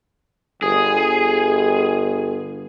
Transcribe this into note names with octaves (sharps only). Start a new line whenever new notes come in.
G1 G#4